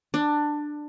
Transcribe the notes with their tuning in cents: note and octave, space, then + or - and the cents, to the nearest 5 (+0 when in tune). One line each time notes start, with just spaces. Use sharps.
D4 +15